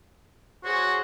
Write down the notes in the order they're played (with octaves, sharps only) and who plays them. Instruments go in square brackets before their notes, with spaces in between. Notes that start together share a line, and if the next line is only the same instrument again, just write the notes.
[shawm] F#4 [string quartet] G#4 C5 C#5